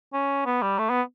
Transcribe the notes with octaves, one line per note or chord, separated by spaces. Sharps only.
C#4
B3
G3
A3
B3